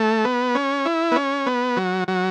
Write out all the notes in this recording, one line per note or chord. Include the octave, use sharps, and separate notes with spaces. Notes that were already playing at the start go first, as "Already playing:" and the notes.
Already playing: A3
B3
C#4
E4
B3
C#4
B3
F#3
F#3